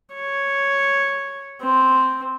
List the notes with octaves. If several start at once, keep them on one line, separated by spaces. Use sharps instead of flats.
C#5
C4